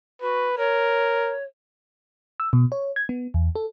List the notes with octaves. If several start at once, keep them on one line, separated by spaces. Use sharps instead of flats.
F#4 B4
A#4 C#5
E6
B2
C#5
G#6
B3
E2
A4